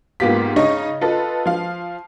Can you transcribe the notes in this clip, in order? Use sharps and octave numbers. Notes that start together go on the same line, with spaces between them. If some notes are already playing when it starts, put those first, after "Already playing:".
G#2 A#3 B3 F4 G4 B6
C#3 C#4 D#4 D#5 C#6
F4 A4 B4 D#5
F3 F5